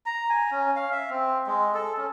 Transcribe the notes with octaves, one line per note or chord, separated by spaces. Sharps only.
A#5
G#5
C#4
F5
E5
C4
G#3
A4
C#4